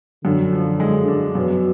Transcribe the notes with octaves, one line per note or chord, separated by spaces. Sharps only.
F#2 D3
F3
G#3
D4
F#2 B2